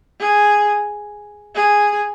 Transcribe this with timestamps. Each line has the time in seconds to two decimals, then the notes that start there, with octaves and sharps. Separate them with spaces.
0.20 G#4
1.55 G#4